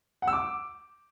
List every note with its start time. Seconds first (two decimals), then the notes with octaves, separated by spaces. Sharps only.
0.22 F#5
0.28 E6
0.33 D6